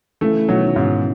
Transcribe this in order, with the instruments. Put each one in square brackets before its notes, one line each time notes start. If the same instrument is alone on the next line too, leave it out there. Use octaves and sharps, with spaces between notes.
[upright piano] C#3 E3 [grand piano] A3
[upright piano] B2 D#3 [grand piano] F#3
[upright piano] D#3
[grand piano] G#2 [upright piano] C#3